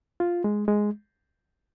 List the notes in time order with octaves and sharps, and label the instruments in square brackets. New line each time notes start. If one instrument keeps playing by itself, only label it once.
[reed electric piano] F4
G#3
G#3